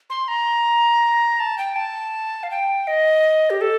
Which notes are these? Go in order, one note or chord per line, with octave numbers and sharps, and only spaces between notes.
C6
A#5
A5
G5
A5
F5
G5
D#5
G4
A4